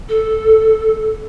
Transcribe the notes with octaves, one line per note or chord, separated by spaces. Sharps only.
A4